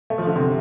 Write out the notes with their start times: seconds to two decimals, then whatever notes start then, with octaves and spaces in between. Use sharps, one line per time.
0.10 A3
0.18 F3
0.27 D3
0.36 C3